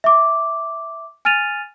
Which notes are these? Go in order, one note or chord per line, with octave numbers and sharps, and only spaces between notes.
E5 D6
G#5 F6 A6 D#7 F7